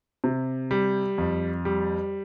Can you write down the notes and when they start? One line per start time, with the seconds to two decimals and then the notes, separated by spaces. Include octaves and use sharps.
0.24 C3
0.71 G3
1.18 F2
1.65 G3